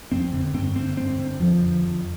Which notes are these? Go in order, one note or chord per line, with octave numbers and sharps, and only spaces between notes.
F2 C4
D3
G2 C4
D3 C4
G2 C4
D3
F2 F3
D3
F2